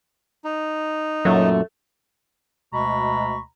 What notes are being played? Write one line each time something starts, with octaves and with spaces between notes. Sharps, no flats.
D#4
F#2 A#2 F#3 A4 E5
D2 B2 G#3 A#5 B5 C#6